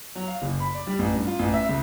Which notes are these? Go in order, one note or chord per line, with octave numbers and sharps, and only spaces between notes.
F#3
F5
F#1
B5
D5
G3
A1
G2
F4
A1
E5
C#2